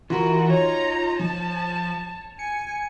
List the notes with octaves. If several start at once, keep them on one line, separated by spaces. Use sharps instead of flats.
E3 F4 F#4 A#4
D#4 C#5 A#5
F3 A5
G#5 C#7